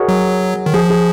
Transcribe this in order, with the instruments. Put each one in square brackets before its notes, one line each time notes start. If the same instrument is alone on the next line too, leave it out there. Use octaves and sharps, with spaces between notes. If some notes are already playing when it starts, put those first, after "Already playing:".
Already playing: [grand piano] F#4 G#4 A#4 C#5 D#5
[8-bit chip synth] F#3
D#3
[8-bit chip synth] F3 [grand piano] G#4
[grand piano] G#4